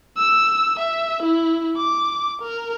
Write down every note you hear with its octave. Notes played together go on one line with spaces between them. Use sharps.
E6
E5
E4
D6
A#4